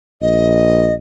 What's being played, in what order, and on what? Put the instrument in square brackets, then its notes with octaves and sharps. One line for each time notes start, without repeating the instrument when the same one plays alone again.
[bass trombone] A#1 [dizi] D#5